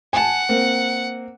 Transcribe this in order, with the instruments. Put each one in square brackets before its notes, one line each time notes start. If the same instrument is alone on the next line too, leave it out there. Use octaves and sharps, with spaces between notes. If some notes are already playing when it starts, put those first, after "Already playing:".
[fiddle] F#5 [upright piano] G#5 A5
[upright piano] A#3 C4